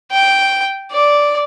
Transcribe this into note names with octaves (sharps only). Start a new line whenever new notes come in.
G5
D5